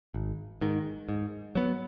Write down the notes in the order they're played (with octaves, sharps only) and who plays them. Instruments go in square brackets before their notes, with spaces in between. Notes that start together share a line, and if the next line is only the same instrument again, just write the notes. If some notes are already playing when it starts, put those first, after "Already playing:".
[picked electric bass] G#1
G#2 D#3
G#2
F#3 B3